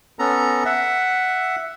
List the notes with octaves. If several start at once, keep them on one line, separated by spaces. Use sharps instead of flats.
B3 C#4 A4 A#5
E5 F#5